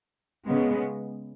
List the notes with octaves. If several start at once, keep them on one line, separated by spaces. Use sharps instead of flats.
C#3 G#3 B3